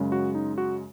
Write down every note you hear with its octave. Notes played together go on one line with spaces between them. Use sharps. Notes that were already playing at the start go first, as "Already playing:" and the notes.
Already playing: F#2 C#3 G#3
F#4
D#4
F#4